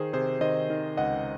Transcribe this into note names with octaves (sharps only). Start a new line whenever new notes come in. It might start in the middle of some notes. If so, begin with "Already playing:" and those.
Already playing: D#3 G#4 C5
C3 G#4 C5
D#3 C5 D#5
D#3
C#2 D#5 F#5